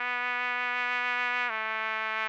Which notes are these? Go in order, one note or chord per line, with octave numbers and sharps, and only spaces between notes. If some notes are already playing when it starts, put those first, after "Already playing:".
Already playing: B3
A3